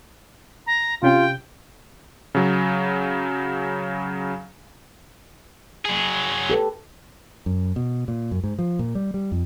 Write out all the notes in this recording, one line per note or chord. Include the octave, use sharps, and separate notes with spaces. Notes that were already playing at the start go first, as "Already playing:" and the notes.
A#5
C3 C#4 F4 G4 G5
C#3 F#3
F#3 G#4
G4 A4 B4
F#2
B2
A#2
F#2
G#2
F3
A#2
G3
G3
F2